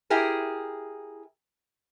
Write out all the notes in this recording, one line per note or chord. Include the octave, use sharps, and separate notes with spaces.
E4 G4 G#4 A#4